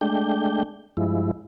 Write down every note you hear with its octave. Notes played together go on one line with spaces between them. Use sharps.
G#3 A3 D4 G5
G2 F3 G#3 E4